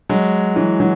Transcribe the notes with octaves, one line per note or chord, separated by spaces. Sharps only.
F#3 G#3
E3 F#3
E3 F#3